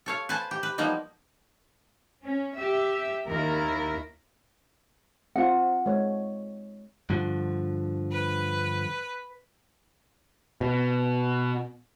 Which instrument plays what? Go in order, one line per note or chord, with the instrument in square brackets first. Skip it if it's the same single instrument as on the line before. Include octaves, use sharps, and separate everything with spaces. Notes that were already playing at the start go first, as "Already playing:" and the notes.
[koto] A4 C#5 F5
B4 C5 G#5 A5
G4
B4
F3 G3 A#3 B3 D#4
[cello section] C#4
G4 E5
D#2 E4 A#4
[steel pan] C4 F4 [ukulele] F#5
[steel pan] G#3 C#5
[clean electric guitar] G2 D3 F3
[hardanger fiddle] B4
[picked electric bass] B2